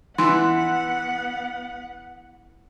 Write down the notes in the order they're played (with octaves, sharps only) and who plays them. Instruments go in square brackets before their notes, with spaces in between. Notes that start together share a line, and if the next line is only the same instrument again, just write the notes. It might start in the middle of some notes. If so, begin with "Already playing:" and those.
[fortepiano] E3 [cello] B3 F#5 [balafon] C6